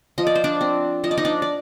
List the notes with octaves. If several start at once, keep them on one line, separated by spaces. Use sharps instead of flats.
F3 D#5
D5
C5
D4 D5
C4
F3 D#5
D5
D#4 D#5
D4 D5
D5